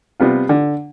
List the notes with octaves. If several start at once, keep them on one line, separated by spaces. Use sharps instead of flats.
C3 G3 B3 F4
D3